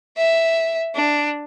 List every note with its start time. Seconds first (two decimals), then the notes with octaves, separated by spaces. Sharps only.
0.18 E5
0.95 D4